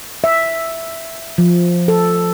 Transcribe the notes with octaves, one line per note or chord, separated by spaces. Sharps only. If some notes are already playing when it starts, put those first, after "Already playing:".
E5
F3
A4